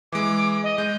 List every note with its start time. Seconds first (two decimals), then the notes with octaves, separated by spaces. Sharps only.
0.12 E3 G#3 D6
0.63 D#5
0.78 G#3 G6